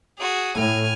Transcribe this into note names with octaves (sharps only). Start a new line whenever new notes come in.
F#4 G#4
A2 G#5 F6